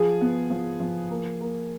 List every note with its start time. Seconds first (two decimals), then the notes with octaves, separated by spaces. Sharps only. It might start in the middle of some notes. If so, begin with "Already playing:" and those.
Already playing: F3 G#4
0.21 B3
0.50 F3
0.80 F3
1.10 A#3
1.41 A#3